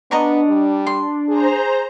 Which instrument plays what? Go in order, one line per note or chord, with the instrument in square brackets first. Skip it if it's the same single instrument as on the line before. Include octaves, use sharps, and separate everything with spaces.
[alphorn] B3 [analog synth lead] D4 [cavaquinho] D#5 A#5 C#6
[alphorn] G3
[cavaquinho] C6
[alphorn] G#4 [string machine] C5 A#5